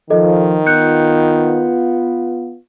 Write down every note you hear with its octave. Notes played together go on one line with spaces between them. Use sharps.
D#3 F3 A4 D#5
B3 F4 F#6 G6 C#7